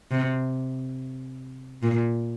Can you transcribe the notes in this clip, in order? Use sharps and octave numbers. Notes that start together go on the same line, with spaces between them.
C3
A#2